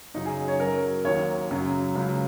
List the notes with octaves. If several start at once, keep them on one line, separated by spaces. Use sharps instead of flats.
F#2 C#3 F#3 D#4
G#4
C#5
F#2 F#3 A#4
D#2 D#3 F#3 C#5
F#2 C#3 F#3
C#2 C#3 F#3